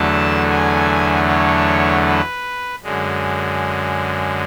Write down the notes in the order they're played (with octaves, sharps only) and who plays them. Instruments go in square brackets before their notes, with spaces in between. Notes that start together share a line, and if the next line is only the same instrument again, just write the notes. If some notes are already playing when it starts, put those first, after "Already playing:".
Already playing: [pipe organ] E2 D3 F#3 A3 A5
G#5
C#5
B4
F#2 D3 G#3